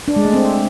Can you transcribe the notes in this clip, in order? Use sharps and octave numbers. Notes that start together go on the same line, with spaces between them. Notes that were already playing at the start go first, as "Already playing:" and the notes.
D4
G#3
A3
C4